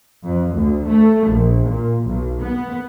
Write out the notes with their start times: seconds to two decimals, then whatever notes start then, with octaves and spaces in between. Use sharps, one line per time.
0.24 F2
0.55 D2
0.86 A3
1.27 A#1
1.67 A#2
2.04 B1
2.40 B3